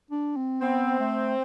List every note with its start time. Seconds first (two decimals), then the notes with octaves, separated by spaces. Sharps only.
0.11 D4
0.36 C4
0.61 B3 C4
1.00 A3